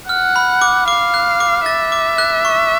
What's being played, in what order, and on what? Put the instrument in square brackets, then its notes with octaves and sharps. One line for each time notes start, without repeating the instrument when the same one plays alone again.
[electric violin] F#5 [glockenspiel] F6
[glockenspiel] B5
D6
[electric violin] F5 [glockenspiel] D6
[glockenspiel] F#6
D6
[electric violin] E5 [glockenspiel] A6
[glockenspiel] D6
F#6
C#6